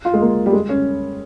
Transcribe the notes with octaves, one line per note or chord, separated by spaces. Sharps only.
F4
G#3
A#3
G3
G#3
C#4